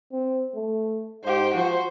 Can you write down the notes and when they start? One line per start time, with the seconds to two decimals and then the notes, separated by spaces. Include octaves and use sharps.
0.12 C4
0.55 A3
1.24 G#2 G4 C5
1.54 F3 F#4 C5